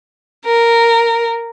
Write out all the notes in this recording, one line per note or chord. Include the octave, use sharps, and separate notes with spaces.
A#4